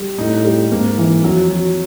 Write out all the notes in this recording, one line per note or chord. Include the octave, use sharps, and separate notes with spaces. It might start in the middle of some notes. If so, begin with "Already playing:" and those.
Already playing: G3
A2 D#4
G3
G#2 A#3
E3
F2 F#3
F#3